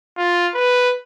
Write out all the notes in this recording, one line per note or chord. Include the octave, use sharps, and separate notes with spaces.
F4
B4